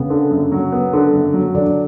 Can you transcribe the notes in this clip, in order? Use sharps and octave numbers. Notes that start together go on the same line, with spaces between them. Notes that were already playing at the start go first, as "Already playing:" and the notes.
Already playing: C#3 B3
D3
F#2
F#3
B3
D3
F#2
F#3
D3 D4